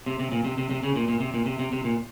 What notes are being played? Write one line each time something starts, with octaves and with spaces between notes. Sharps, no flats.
C3
C3
A#2
C3
C3
C3
C#3
A#2
A#2
C3
A#2
C3
C3
C3
A#2